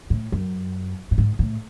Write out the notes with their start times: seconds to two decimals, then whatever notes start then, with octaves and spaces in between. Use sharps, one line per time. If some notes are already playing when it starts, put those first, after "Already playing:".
0.10 A2
0.32 F#2
1.11 A2
1.18 G#2
1.39 A2